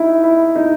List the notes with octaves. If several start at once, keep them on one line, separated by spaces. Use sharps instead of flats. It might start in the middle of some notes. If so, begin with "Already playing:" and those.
Already playing: D#4 E4
E4
D#4